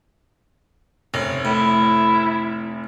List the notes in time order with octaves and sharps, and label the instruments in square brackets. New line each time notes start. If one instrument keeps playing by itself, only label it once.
[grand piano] F1 [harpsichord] C#4
[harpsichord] A2 [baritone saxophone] E4